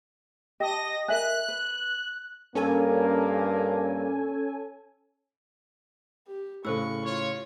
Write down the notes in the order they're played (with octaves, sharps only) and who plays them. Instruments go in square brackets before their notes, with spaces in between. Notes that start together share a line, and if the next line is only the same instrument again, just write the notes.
[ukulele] G4 A5 [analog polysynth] D#5 A#6
[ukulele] A#4 E5 G#5 [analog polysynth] F#6
[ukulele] B4
[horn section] G2 A#3 [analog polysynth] C#4 A4 G#5
[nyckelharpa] G4
[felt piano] A2 C#3 [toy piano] A4 C5 E6 [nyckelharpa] C#6
[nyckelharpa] F4 [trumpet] C#5